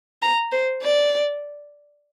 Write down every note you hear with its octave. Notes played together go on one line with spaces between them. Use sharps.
A#5
C5
D5